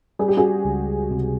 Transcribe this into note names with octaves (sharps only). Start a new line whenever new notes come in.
G3 G#4
G4
F#4 G#4
C#2
C3